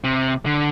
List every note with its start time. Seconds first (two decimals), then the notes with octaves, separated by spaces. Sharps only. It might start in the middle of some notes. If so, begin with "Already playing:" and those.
0.04 C3
0.46 D3